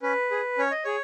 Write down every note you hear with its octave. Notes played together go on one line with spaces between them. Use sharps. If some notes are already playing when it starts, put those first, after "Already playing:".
C#4 B4
G#4
C#4 C#5
D#5
G#4 C#5